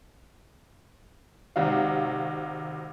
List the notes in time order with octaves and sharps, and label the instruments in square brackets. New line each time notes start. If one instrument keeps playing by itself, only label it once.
[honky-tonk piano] G#1 C3 D#3 F#4 F5